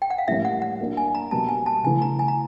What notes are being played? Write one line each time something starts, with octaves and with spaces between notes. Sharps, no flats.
G5
F#5
F5
A2 E3 G3 A#3 C#4 E5
F#5
F#5
F#3 A#3 D4
G#5
A#5
B2 G3 A#3 A5
G#5
A5
C#3 E3 A3 G#5
A#5
G#5
A#5